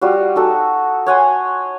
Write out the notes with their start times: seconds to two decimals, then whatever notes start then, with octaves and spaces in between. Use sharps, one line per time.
0.01 G3 F4 F#4
0.35 D#4 F#4 A4
1.06 C#5 F#5 G#5 C6